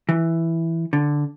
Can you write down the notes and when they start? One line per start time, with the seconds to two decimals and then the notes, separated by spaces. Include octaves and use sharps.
0.09 E3
0.93 D3